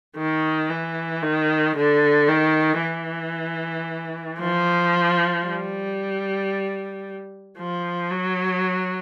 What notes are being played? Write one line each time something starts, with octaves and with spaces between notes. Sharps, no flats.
D#3
E3
D#3
D3
D#3
E3
F3
G3
F3
F#3